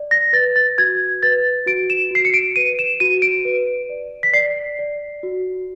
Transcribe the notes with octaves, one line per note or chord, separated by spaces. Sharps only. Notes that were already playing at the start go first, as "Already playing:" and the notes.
Already playing: D5
A#6
B4 A6
A6
F#4 G#6
B4 A6
F#4 D7
E7
F#4 C7
C#7
D7
B4 D#7
E7
F#4 D#7
D7
B4
D5
B6
D5 C7
D5
F#4